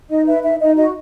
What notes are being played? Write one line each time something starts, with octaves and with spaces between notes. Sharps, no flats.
D#4 D#5
B4 E5
D#4 E5
D#4 D#5
F#4 D#5